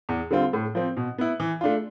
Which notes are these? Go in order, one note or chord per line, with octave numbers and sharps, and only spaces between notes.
E2
D3 G3 C4 F4
A2
F3 C4
B2
B3 E4
E3
A3 D4 F4